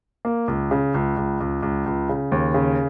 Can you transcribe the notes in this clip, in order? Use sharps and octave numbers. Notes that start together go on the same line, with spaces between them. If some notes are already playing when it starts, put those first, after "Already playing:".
A#3
C#2
C#3
C#2
C#2
C#2
C#2
C#2
C#3
D#2
C#3